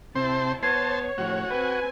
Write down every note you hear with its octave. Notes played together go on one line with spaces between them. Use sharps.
C3 C4 E4 C5 A5
B3 C5 C#5 A5 G#6 C7
A2 F3 F#4
C4 B4 G#5